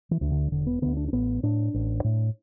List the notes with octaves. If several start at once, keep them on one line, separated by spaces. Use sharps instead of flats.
E3
D2 D3
D3
E1 D3
B3
D2 D3 B3
D4
D4
A1 B3
A2 D4
A1
A2